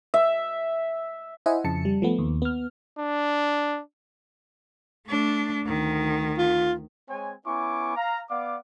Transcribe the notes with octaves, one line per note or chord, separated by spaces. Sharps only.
E5
E4 C5 D#5 E5 F#5 G#5
F2 C#3 A5 C#7
G3
F3 A3 B3
D#2
B3 F6
D4
A3 D4
D2 D#3
F4
G#3 C4 C#5 G#5
B3 C#4 E4 G#5 C#6 D6
F5 A#5
B3 D5 F5 F#5 D6